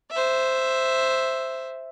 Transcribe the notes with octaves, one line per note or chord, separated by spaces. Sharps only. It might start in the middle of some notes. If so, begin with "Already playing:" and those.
C5 E5